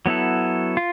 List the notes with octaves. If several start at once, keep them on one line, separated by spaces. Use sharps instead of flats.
F#3 B3 E4 A4
F4